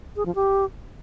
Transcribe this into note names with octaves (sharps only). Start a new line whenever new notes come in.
G#4
F3
G4